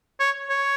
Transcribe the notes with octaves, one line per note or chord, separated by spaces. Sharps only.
C#5
C#5